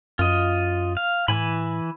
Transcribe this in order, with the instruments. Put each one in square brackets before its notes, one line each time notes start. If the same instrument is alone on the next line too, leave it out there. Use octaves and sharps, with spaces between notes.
[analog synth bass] F#2 [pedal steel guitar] F4 D#5
[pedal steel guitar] F5
[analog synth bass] A2 [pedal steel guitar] E3 G#5 B5